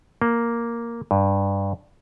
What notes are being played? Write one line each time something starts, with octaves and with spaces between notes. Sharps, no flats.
A#3
G2